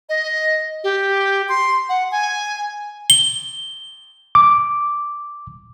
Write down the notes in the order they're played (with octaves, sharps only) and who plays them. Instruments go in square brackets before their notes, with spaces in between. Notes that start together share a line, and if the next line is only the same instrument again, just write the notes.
[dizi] D#5
G4
C6
F#5
G#5
[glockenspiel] G7
[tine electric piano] D6